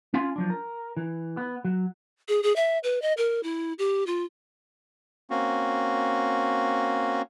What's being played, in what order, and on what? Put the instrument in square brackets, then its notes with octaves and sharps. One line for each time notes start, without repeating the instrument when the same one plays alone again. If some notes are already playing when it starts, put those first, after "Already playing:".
[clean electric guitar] C#4 F4 F5 G#5 C6
F3 F#3 D4
A#4
E3
B3
F#3
[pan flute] G#4
G#4
E5
B4
D#5
A#4
E4
G4
F4
[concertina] A#3 C4 C#4 F#4